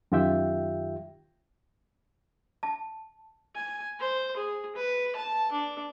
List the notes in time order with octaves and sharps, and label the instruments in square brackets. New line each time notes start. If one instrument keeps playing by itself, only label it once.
[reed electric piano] F#2 D#3 F4 G4 E5 G5
[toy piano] A5
[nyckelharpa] G#5
C5
G#4
B4
A5
D4